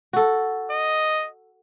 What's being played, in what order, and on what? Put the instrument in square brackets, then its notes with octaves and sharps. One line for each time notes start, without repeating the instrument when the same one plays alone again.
[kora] F#4 A4
[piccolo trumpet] D#5